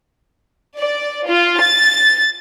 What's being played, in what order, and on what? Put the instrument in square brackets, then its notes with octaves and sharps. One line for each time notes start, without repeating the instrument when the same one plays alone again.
[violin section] D5
F4
A6